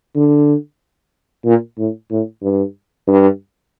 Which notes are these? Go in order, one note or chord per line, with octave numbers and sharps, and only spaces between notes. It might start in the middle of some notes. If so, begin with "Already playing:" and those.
D3
A#2
A2
A2
G2
G2